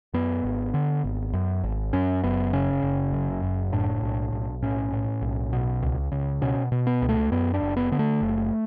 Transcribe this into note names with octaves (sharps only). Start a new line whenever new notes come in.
F#2 B3
G#1
D3
G#1
F#2
G#1
F#2 C#4
F#1 B3
C#3 C#4
F#1
F#2
F#1
A2 D4
B1
B1
A2 C#4
A2
B1
B2
C#2
C#2
B2 C#4
B2
B3
C#2
A3
F#2 B3
D4
F#1
B3
D3 B3
A3
F#1